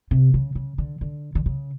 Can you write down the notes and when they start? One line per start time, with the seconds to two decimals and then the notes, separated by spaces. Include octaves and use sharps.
0.11 C3
0.34 C#3
0.55 C#3
0.78 D3
1.01 D3
1.35 D3
1.46 C#3